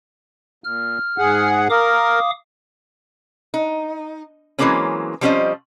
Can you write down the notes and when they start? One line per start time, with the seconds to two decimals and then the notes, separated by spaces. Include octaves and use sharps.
0.64 A#2 F6
1.18 G#2 G#4 F#5
1.70 A#4 F5 D6 D#6
3.54 D#4
4.59 E3 F#3 G#3 A#3 C4 C#4
5.21 F3 G3 C4 C#4 C5 D#5